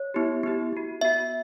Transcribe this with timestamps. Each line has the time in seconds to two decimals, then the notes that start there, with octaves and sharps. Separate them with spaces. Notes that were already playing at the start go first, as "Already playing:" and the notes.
Already playing: C#5
0.14 B3 E4 G4
0.43 B3 E4 G4
0.73 B3 F#4
1.01 B3 F#4 E5